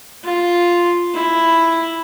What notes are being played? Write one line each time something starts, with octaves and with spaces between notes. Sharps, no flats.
F4
E4